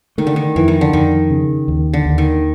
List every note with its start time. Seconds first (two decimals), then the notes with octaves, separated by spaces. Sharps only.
0.18 D#3 A3
0.27 D3
0.36 D#3
0.56 F2 E3
0.68 D#3
0.81 D3
0.93 F2 D#3
1.30 C#3
1.68 D#2
1.93 D3
2.06 D#2
2.18 D#3